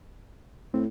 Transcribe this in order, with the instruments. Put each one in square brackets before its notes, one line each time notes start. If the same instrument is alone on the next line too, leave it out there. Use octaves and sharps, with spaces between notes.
[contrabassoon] A2 [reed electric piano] C4